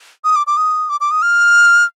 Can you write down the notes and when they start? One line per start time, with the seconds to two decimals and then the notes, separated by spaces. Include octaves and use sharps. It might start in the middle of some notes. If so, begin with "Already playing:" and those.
0.24 D#6
0.36 D6
0.47 D6
0.57 D#6
0.89 D6
1.00 D6
1.11 D#6
1.22 F6